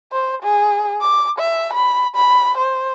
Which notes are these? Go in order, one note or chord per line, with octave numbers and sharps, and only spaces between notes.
C5
G#4
D6
E5
B5
B5
C5